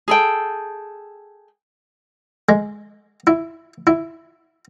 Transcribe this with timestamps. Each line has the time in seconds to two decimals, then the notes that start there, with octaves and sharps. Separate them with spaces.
0.08 G#4 A4 G5
2.49 G#3
3.27 E4
3.87 E4